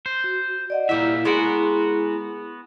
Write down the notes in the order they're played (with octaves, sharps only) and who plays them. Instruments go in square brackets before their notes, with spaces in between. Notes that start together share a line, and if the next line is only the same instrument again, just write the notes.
[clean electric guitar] C5
[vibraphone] F#4
D5 D#5 F#5
[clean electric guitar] A#2 E5 [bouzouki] F#3 G3 D#4 [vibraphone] E4
[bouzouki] G#3 A#4 F#5 [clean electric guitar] B3 F#4